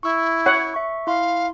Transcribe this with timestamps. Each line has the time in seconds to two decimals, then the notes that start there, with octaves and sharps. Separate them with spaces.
0.03 E4 C#6 E6
0.46 C#5 F#5
0.74 E5 C#6
1.07 E4 F5 C6